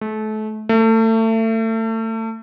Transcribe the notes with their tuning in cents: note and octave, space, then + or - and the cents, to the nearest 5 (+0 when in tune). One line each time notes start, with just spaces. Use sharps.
A3 -30
A3 +30